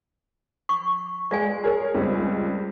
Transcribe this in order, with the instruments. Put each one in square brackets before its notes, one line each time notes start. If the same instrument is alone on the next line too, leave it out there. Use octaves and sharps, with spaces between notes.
[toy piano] C#6
[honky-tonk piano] G#3 [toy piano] D5 F5 G#5
[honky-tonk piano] G#4 A#4 C#5
C#2 G3 C4